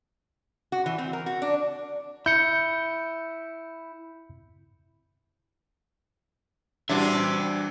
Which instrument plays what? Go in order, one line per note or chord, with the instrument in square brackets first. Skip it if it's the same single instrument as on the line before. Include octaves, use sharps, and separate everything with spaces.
[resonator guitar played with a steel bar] F#4
E3
C4
A#4
F#4
D4
[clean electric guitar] E4 [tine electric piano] G6 C#7
[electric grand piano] E3 G3 F#4 [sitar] D4 [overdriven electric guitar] C5 E5